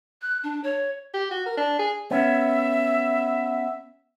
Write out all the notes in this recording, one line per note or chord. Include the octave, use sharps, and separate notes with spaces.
F#6
D4
C#5
G4
F#4
A#4
D4
G#4
B3 C#4 E5